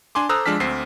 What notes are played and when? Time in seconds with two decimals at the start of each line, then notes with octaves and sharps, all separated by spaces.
0.15 D4 G#5 C6 D6
0.29 A4 C5 A#5 D#6 E6 F#6
0.46 F3 G#3 D4 A5 F6 B6
0.60 D2 C4 C7